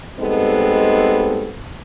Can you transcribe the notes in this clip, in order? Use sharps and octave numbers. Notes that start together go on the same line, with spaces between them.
G3 G#3 B3 C4 D#4 A4